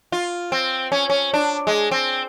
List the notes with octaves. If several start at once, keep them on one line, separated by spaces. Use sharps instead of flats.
F4
C4
C#4
C#4
D4
G#3
C4